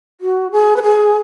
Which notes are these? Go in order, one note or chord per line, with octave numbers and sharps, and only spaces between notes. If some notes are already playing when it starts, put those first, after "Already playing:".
F#4
G#4
B4
G#4